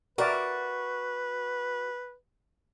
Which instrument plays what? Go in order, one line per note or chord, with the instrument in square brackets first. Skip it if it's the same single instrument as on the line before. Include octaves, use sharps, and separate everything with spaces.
[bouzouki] F#4 [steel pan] A#4 D5 E5 [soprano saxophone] B4